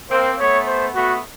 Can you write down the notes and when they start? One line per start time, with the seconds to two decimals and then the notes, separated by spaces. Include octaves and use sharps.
0.10 A#3 C4 C5
0.39 A3 B3 C#5
0.67 C5
0.95 A3 B3 F#4